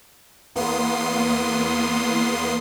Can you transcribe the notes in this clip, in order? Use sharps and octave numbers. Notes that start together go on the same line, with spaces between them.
E2 A#3 B3 C6 D#6 C7